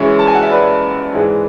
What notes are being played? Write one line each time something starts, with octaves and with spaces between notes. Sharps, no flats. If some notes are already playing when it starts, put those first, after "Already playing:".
Already playing: F#2 E3 G#3 C#5 E5
A5
G#5
F#5
E5
B4 D5
G#2 E3 G#3